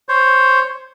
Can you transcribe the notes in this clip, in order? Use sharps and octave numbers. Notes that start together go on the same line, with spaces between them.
C5 C#5